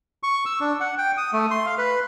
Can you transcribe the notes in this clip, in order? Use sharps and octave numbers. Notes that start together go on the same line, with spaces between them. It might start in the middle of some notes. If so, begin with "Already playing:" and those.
C#6
E6
D4
F#5
G5
D#6
A3
C6
F5
B4